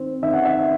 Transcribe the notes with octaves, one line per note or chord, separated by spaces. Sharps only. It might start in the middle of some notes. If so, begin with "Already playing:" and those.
Already playing: D#3 C4
D#3 E5
F#5
E5